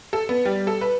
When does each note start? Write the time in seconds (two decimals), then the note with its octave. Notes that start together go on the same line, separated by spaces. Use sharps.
0.13 A4
0.29 B3
0.45 G3
0.67 A4
0.81 B4